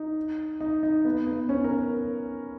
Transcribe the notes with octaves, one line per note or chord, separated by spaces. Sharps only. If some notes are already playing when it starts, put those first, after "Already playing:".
Already playing: D#4
D#4
D#4
B3
B3
C#4
A#4